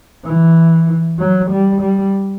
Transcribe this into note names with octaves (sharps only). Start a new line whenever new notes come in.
E3
F#3
G3
G3